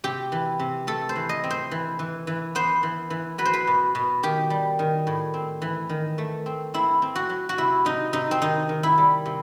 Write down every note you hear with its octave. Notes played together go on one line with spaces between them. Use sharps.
C3 G4
E3
C3
A3 A4
C5
E3
D#5
C4
C5
E3
E3
E3
B3 C5
E3
E3
F#3 B4
C5
B4
B2
B2
D#3 G4
G3
D#3
A2
C4
E3
D#3
A3
C4
C4 E4
C4
F#4
F#3
F#4
C3 E4
C3 D#4
C3 D#4
C4
D#3 D#4
D#3
E4
G3
C3